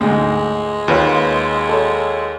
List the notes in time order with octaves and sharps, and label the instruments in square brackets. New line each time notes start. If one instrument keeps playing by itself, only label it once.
[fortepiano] D2 G#2 [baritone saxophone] G#3
[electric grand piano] D#2 [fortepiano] F4 B4 C#5
[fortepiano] A4 C#5